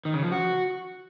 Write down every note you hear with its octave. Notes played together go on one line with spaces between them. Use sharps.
D#3
C#3
F3
F#4